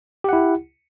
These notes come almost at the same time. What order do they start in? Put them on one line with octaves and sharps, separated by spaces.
G4 F#5 E4